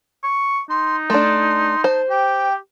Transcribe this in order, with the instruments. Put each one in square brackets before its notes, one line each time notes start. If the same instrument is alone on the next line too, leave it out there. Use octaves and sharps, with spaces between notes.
[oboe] C#6
[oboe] D#4 [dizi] C6
[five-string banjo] A3 D4 [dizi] C6
[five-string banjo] C5 [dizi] A5
[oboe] G4 [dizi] G5